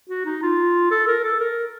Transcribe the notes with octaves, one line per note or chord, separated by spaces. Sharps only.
F#4
D#4
F4
A4
A#4
A4
A#4